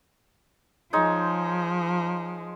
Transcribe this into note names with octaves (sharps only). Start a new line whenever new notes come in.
F3 G#3 D#4 C#5